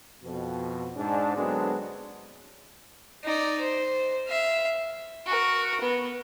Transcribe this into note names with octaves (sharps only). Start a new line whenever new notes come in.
F2 B2
G#2 D4
D3 F#3 G#3 B3 C4 D4
D#4 D5
C5
E5 F5
F#4 A#4
B3